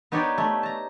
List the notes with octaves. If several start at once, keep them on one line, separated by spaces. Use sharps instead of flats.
B3 D#4 G4 C#5 D5
A3
A5 A#5